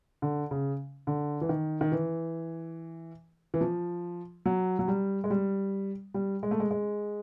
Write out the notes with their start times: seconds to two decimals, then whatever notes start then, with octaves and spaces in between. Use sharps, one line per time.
0.22 D3
0.51 C#3
1.07 D3
1.41 E3
1.49 D#3
1.81 D#3
1.92 E3
3.54 E3
3.61 F3
4.46 F#3
4.79 F#3
4.88 G3
5.24 G#3
5.30 G3
6.14 G3
6.43 G#3
6.51 A3
6.60 G#3
6.71 G#3